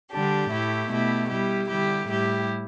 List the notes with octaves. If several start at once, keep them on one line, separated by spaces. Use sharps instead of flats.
D3 G3 D4 G4
A2 A3 E4 G4
B2 A3 E4 G4
G3 E4 G4
D3 G3 E4 G4
A2 G3 E4 G4